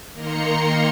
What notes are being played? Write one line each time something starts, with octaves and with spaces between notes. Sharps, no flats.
D#3 A#3 A#5 C6 C#7